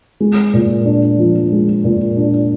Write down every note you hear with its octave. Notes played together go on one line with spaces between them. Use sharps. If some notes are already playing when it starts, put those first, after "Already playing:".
G#3
A#2
D4
F3
G#3
A#2
D4